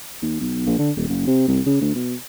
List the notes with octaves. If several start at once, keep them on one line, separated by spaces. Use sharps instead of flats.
D#2
B1
A#1
D3
D#1
F#1
C3
C2
C#3
D2
B2